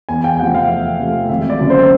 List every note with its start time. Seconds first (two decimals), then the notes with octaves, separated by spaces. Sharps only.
0.09 E2 G#5
0.24 G5
0.39 C3 F3 A3 F#5
0.55 F5
0.69 E2 E5
1.00 C3 F3 A3
1.29 G#1 E5
1.50 D5
1.59 F#2 D3 F#3 A#3
1.70 C5